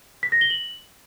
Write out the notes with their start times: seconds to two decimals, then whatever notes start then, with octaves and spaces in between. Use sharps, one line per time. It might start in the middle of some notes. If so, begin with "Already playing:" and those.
0.23 B6
0.32 A#6
0.41 G7
0.50 F#7